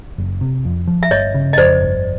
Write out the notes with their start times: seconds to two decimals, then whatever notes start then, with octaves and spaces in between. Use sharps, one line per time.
0.18 F#1
0.41 C3
0.65 F2
0.87 F3
1.03 E5
1.11 G1 C#5 D#5
1.34 C#3
1.53 D#5
1.58 F2 C5 D5
1.81 G1